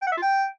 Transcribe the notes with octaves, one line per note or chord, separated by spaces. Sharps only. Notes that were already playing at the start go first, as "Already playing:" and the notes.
G5
F#5
E5
F4
G5